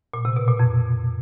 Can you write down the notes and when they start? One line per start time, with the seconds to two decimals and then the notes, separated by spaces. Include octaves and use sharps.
0.14 A#2
0.25 C3
0.36 B2
0.48 A#2
0.59 F2